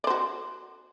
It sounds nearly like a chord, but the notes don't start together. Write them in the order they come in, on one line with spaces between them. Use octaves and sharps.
D5 C5 F#4